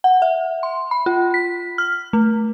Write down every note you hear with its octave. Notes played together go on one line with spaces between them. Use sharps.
F#5
E5
C6
B5
F4
B6
F6
A3